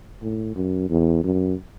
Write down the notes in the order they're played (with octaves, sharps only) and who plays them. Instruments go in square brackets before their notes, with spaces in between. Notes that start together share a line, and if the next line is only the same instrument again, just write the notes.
[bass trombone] A2
F#2
E2
F#2